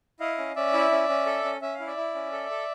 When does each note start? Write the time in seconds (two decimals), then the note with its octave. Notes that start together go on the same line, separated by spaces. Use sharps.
0.20 E4 D#5 F5
0.38 C#4
0.56 C#4 D5 E5
0.73 E4
0.91 C#4
1.09 C#4
1.26 A4
1.44 C#4
1.62 C#4 E5
1.75 F5
1.80 E4
1.87 D5 E5
1.97 E4
2.15 C#4
2.33 A4
2.50 A4